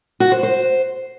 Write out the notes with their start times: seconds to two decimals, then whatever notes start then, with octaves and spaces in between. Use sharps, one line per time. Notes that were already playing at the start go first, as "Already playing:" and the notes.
0.20 F#4
0.32 C5
0.43 C5